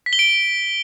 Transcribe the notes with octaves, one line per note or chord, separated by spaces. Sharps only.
B6
G7
D7